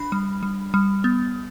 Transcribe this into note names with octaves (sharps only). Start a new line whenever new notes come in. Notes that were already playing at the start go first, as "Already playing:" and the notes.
Already playing: D4 B5
G3
G3
G3
B3